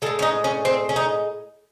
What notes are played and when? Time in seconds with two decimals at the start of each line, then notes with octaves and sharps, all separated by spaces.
0.02 G#3 A4
0.06 A2
0.19 C#4
0.22 D#4
0.44 C#4
0.65 C4
0.89 C#4
0.96 D#4